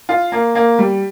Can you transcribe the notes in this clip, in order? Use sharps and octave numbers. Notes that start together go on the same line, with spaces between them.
F4
A#3
A#3
G3